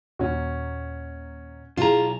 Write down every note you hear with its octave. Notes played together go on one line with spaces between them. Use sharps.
D#2 A#2 C#4 F#4
B1 E4 F4 G#4 A#5